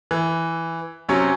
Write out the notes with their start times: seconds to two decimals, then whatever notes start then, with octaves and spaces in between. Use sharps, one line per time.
0.11 E3
1.09 C3 F#3 C#4